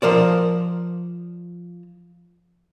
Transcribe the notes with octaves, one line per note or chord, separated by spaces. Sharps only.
F3 A#4 C5 D5